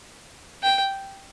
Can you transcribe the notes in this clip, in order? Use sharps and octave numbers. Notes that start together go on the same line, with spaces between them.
G5